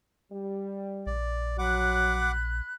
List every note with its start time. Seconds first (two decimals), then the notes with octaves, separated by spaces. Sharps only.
0.32 G3
1.06 A#1 D5
1.59 F#3 F#5 B5 D6 F#6